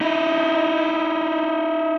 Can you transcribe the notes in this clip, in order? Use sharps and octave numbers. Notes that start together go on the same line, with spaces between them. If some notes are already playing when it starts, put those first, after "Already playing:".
D#4 E4